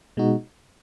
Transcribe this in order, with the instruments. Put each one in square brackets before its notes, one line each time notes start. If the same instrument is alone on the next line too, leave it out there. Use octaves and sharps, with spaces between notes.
[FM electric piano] B2 G#3 D#4 F#4